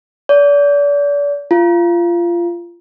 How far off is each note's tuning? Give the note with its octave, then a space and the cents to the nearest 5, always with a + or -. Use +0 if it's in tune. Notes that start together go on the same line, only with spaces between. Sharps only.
D5 -35
F4 -20